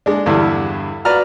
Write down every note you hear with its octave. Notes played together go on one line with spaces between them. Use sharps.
G#3 D4
E2 G2 D3 E4
F#4 B4 D5 A#5 F6